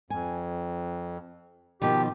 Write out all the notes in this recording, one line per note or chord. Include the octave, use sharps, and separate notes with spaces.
F2 G#5
B2 D#3 F3 G4